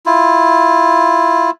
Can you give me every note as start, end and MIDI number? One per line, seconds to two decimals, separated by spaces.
0.06 1.50 64
0.06 1.50 65